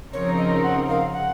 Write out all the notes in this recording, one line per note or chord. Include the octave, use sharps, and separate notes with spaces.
C#3 F3 C4 D#4 A#4 C#5
D#5
F#5
F5
F#5